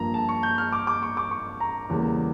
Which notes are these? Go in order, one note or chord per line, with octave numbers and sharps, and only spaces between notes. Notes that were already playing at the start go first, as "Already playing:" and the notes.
Already playing: G2 F3 A#3 A#5
A5
C#6
G6
F6
D6
D6
C#6
D6
C#6
A#5
E2 C#3 G3 A#3